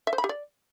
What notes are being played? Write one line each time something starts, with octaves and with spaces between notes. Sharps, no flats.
E5
C5
B5
G4
D5